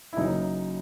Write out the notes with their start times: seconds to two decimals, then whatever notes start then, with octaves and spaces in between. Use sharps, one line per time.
0.13 E4
0.16 F#1 F#2 C#3 D#4